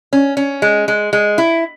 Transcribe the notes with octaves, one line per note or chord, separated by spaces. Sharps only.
C#4
C#4
G#3
G#3
G#3
E4